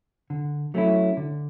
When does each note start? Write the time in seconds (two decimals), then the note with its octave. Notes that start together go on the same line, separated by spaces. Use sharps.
0.30 D3
0.74 F#3 A3 C#4 E4
1.17 D3